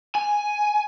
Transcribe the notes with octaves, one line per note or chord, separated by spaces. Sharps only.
G#5